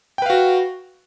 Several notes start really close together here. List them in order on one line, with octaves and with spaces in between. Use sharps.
G5 B4 F5 F#4